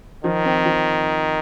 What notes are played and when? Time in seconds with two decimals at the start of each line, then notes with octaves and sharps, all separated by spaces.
0.24 D#3 F3
0.45 C4
0.66 F3